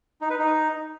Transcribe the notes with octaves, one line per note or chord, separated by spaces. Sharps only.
D#4
B4
D#4